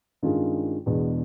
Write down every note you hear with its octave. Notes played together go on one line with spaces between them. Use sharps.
G2 D#3 G#3 C#4 F4
E2 B2 G#3 B3 D4